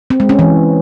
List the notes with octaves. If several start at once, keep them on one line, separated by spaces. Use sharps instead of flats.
C4
G#3
C#4
E3